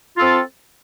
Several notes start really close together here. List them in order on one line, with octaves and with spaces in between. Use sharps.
F4 A4 C4